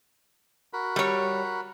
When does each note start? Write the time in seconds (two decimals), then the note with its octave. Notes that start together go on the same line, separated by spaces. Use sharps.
0.73 F#4 A#4 B5
0.96 G3 C#5